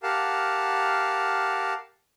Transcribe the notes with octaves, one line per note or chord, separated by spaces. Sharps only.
G4 A#4 F5 F#5 A5